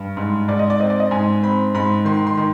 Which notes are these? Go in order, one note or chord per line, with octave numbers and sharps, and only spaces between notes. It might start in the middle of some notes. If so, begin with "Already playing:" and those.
Already playing: G2
G#2
G#2 D5
D#5
D5
C4 D#5
D5
D#5
G#2 G#5
C4 B5
G#2 B5
D#3 C6
C6
D#3